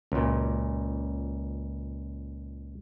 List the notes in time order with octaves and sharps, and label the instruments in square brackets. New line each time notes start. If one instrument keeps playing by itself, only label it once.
[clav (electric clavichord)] C#2 A#2